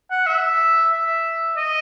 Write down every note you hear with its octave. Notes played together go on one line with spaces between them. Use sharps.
F#5
E5
E5
D#5